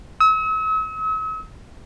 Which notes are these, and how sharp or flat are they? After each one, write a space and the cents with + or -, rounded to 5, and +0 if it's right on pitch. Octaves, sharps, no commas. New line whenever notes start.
E6 -45